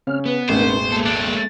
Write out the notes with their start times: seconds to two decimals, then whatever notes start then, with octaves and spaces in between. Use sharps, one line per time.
0.07 C#3 C4 C#5 F6
0.26 B3 B4
0.49 E1 A1 C4 D4 A#4 C5
0.92 G#3 A#3 A4
1.06 A2 D4
1.23 A#3